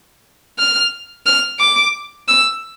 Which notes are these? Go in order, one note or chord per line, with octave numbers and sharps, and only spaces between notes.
F6
F6
D6
E6